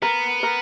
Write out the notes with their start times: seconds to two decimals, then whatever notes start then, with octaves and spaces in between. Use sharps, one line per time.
0.02 B3 A#4
0.43 A#4